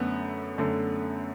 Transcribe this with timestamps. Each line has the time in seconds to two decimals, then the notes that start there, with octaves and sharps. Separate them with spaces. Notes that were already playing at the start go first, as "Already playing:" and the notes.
Already playing: F#2 D3 A3 B3
0.58 F#2 D3 A3